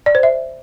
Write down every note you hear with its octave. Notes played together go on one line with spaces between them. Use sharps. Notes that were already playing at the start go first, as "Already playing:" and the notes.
D5
C5
E5